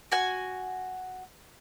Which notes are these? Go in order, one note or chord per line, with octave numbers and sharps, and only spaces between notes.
F#4 G#5